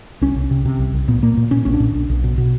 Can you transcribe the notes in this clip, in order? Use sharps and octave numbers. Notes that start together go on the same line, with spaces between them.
C2 C#4
C2
C3
C3
C2
C2
A#2 B3
A#2 A#3
A#2
A#2 C#4
A#1 C#4
D4
A#2
B1
B1
B2
B2